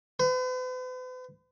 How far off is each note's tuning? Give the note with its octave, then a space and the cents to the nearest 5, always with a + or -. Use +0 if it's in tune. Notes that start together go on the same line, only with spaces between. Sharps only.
B4 +45